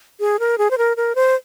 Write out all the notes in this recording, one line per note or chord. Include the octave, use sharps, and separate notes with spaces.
G#4
A#4
G#4
C5
A#4
A#4
C5